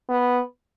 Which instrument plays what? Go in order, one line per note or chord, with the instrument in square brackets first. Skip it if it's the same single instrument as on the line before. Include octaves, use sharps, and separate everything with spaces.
[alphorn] B3